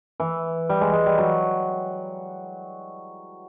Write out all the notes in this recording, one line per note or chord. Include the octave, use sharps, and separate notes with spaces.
E3
G3
G#3
G#3
G3
F#3